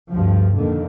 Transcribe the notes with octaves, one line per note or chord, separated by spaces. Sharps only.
D2 G2 F3
F2 A#2 D3 D#3